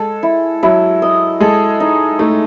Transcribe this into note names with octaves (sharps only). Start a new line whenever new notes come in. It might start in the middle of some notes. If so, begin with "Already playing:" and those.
Already playing: G#3 A4
E4
F#3 E4
D#5
G#3 A4
D#4
A3 D#4